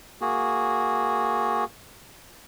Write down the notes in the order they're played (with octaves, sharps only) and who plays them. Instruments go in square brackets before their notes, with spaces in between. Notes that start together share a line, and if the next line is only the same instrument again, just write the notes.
[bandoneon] A#3 F#4 G#4